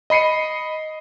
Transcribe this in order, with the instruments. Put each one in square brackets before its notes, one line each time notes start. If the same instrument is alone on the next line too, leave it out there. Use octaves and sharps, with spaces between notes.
[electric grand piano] D#5 B5 C7 C#7 D#7